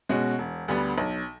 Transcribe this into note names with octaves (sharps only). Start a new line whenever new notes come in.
B2 G#3 C#4 F#4
E1
D2 D3 G3 B3
B1